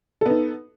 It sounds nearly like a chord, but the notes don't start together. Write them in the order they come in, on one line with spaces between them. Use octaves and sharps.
A4 B3 D#4